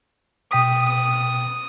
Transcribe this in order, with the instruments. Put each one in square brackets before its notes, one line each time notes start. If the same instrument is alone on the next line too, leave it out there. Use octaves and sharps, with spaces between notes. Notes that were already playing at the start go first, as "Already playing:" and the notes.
[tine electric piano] B2 G5 B6 [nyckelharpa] D#6